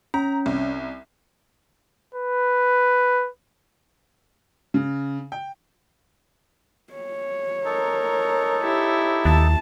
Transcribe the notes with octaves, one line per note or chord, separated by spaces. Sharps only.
C#4 A#5
C2
B4
C#3
G5
C#5
D#4 A4 A#4
E4 G4
D#2 A5